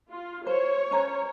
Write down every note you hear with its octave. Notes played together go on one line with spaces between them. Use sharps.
F4
C5 C#5
C#4 B4 A#5